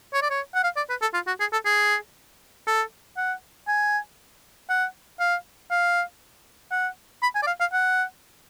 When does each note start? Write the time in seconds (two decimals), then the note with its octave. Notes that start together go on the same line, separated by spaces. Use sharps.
0.14 C#5
0.22 D5
0.30 C#5
0.55 F#5
0.64 F5
0.76 D5
0.90 B4
1.02 A4
1.14 F4
1.27 F#4
1.40 G#4
1.53 A4
1.65 G#4
2.67 A4
3.17 F#5
3.68 G#5
4.69 F#5
5.20 F5
5.71 F5
6.72 F#5
7.23 B5
7.35 G#5
7.42 D5
7.47 F5
7.60 F5
7.73 F#5